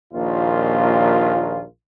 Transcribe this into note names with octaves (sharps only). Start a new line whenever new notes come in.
A#1 D#2 A#2 F4